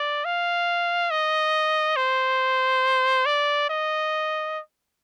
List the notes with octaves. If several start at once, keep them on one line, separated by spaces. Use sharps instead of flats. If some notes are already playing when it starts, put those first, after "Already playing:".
Already playing: D5
F5
D#5
C5
D5
D#5